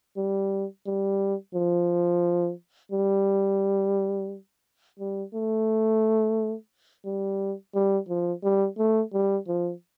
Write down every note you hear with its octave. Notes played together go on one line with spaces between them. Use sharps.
G3
G3
F3
G3
G3
A3
G3
G3
F3
G3
A3
G3
F3